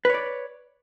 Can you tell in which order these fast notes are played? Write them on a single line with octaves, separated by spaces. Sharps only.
B4 C#5 D5